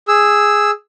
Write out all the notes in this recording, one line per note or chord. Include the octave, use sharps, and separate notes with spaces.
G#4 E6